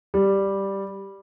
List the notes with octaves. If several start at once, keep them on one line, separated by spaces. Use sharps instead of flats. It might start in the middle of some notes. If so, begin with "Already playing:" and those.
G3